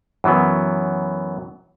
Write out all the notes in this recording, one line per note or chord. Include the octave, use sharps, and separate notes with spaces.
F#2 E3 F#3 B3